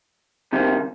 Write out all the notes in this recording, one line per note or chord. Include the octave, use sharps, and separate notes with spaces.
C2 C3 D#3